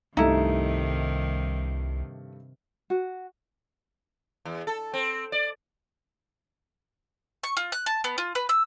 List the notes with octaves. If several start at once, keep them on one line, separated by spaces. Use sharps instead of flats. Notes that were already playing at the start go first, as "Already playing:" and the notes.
C2 G2 C3 D#3 A3 D#4 E4 E5
F#4
E2
A4
C4
D5
C#6
F4
F#6
A5
B3
F4
B4
E6